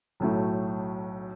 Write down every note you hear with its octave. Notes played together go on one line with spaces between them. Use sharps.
B1 A2 F#3 A3